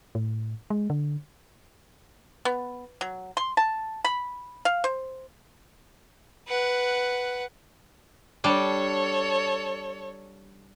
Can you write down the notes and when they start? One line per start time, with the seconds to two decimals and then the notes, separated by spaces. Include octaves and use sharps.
0.15 A2
0.70 G#3
0.90 D3
2.45 B3
3.01 F#3
3.37 C6
3.57 A5
4.05 B5
4.65 F5
4.84 C5
6.48 B4 F#5
8.44 G3 D4 A4 C#5